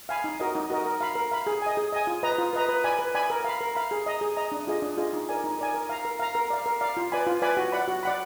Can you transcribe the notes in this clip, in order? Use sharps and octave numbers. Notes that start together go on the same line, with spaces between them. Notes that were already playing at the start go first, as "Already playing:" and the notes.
F5 G#5 B5
D#4
F#4 A#4 D#5
D#4
F#4 A#4 D#5
A#4
F5 B5
A#4
F5 B5
G#4
D#5 G#5
G#4
D#5 G#5
F4
B4 D#5 A#5
F4
B4 D#5 A#5
B4
D5 G#5 B5
B4
D5 G#5 B5
A#4
F5 B5
A#4
F5 B5
G#4
D#5 A#5
G#4
D#5 A#5
D4
F4 G#4 D#5
D4
F4 G#4 D#5
D#4
A#4 D5 G#5
D#4
A#4 D5 G#5
A#4
F5 A#5
A#4
F5 A#5
A#4
D5 F5
A#4
D5 F5
F4
B4 D5 G#5 B5
F4
B4 D5 G#5 B5
F#4
D5 F#5 B5
F#4
D5 F#5 B5